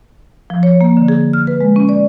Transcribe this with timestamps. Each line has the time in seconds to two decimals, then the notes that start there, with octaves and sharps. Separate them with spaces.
0.50 F3
0.63 C#5
0.81 A#3
0.97 D3
1.08 G#4
1.33 F6
1.47 B4
1.61 G#3
1.76 C#4
1.89 D5